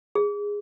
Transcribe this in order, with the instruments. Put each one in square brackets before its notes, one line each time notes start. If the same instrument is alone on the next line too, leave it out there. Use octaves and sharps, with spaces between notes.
[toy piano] G#4